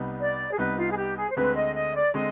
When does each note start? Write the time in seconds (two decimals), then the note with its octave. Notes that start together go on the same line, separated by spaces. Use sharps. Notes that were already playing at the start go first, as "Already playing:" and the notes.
Already playing: C2 C3 G3 B3 D#4
0.20 D5
0.52 G#4
0.58 C2 C3 G3 B3 D#4 B4
0.78 F4
0.91 G#4
0.97 G4
1.17 G#4
1.30 C5
1.37 D2 D3 G#3 C4 B4
1.56 D#5
1.75 D#5
1.95 D5
2.14 D3 G#3 C4 D#5